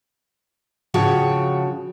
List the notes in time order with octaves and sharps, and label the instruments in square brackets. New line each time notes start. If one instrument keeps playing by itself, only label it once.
[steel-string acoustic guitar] C#3 F3 F#4 C#5 G5